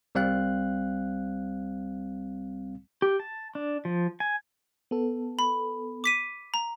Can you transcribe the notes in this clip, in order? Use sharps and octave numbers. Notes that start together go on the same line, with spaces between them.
C2 G3 C4 F5 F#6
G4
A5
D4
F3
G#5
B3 A4
B5
D6 B6 D#7
A#5